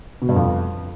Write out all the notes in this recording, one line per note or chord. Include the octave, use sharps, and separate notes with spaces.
B2
G2
F2